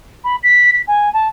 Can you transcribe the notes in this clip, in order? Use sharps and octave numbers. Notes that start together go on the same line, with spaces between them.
B5
B6
B6
G#5
A5